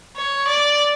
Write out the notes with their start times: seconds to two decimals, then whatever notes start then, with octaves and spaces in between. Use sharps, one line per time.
0.17 C#5
0.48 D5